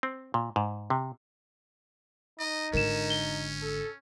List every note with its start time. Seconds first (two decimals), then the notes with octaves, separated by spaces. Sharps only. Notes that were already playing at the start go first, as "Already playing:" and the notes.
0.03 C4
0.34 A#2
0.56 G#2
0.90 C3
2.40 D#4 D#5
2.73 G#1 D3 C#4 A#4 E7
3.10 G7
3.62 A4